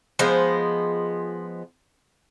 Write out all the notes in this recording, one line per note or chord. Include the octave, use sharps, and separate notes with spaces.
F3 G#3 B3 C5